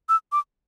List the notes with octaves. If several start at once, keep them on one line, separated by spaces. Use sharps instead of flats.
E6
D6